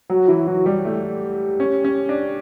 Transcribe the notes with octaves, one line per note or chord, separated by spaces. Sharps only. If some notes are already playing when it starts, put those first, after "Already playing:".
F#3 F#4
E3 E4
F#3 F#4
G3 G4
A3
C#4
C#4
D4